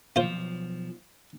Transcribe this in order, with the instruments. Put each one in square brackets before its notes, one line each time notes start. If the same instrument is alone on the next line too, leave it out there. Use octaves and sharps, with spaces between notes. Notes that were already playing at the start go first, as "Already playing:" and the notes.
[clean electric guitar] B1 F3 [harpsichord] F4 C5